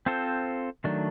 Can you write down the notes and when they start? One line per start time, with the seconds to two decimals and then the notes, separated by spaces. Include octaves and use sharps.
0.06 C4 F4 A4 C5
0.84 D#3 F#3 A3 D4